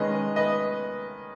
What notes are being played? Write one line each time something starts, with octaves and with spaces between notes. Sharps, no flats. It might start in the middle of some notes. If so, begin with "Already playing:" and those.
Already playing: D#3 G#3 C#4 B4 D#5
B4 D#5